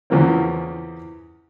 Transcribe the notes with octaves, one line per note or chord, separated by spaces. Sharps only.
E2 C#3 E3 F3 A#3 C4